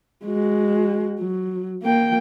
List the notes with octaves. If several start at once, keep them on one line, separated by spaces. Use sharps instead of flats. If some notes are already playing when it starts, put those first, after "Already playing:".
G#3 F#4
F#3
A#3 G5